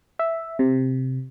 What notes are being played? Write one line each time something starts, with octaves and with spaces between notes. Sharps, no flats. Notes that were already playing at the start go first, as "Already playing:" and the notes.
E5
C3